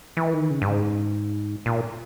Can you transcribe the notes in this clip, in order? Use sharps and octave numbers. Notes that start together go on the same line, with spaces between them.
E3
D#3
C#3
G2
G#2
A#2